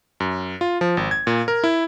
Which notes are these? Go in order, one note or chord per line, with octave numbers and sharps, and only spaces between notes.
F#2
F4
F3
G#1
G#6
A#2
A#4
E4